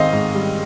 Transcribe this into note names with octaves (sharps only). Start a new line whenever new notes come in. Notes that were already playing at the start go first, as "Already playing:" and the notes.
Already playing: G#2 D#3 C4 D#5 F5
G#2
G3